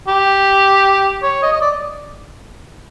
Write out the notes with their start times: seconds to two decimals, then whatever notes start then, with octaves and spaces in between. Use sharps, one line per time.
0.08 G4
1.23 C#5
1.43 D#5
1.53 D#5
1.61 D5